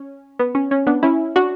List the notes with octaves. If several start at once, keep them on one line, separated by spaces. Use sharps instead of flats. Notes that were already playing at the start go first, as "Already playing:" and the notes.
Already playing: C#4
B3
C#4
C#4
B3 D4
C#4 E4
D4 F#4